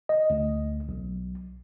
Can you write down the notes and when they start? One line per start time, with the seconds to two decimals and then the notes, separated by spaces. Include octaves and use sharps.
0.09 D#5
0.30 D2
0.89 B1